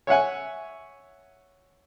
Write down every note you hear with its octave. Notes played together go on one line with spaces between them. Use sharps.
C#5 E5 F#5 G#5